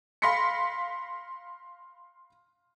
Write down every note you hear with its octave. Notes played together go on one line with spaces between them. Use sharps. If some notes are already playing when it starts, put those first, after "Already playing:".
F5 B5 C6 A#6 B6 C#7